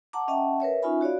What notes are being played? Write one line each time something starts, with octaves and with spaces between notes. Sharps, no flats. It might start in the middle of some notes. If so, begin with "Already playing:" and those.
F#5 A5 A#5 D6
C#4 D#5 E5 F#5 G5 A5
A#4 B4 C#5 E5
C#4 D#4 F4 E5 G#5 B5
F#4 C#5 D5 F5